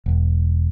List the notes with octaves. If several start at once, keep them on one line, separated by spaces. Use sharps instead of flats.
E1